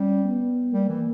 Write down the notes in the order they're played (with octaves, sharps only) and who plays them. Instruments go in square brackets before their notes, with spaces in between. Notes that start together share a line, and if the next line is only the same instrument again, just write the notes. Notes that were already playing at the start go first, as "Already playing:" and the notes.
Already playing: [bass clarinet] G3 [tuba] C#4
[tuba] B3
[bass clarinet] G3 [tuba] A#3
[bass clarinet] E3